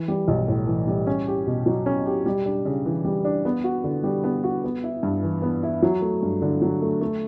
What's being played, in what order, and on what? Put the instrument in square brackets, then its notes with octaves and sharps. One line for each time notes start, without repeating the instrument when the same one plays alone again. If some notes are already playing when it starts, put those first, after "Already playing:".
Already playing: [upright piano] E3
G3
B1
A2
E3
G3
C#4
G4
B2
F#3
C#4
G4
G3
D4
C#3
E3
G3
D4
B3
F#4
D3
G3
B3
F#4
B3
E4
G2
E3
B3
E4
F#3
A3
G2
D3
F#3
A3
A3